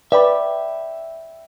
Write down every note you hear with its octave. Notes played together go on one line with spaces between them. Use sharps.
B4 D5 E5 G5 B5